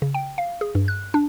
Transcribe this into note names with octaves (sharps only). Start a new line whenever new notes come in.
C#3
G5
F5
G#4
G2
F#6
D4